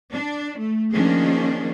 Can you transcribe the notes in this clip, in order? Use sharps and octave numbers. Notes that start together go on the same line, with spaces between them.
D4
A3
D#3 F3 A#3 C#4 D4 G#4